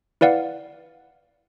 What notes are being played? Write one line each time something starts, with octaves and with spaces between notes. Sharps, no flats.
E4 B4 D5 F5 F#5